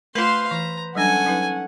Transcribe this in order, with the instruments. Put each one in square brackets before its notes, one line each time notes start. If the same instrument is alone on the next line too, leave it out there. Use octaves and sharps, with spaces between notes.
[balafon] A3 F4 [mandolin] B4 C5 [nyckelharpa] F5 C6
[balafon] E3 [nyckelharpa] A#5
[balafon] F#3 G3 D4 [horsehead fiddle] C#4 F#5 [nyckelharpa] A4 G#5
[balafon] F#3 D#4 B4